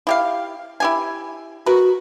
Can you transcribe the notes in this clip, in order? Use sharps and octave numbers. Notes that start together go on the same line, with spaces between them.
E4 G4 F5
E4 G4 G#5
F#4 A#4 B4